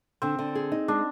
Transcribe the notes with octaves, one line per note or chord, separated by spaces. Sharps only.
D3 C4
D3
G#4
D#4
G#3 D4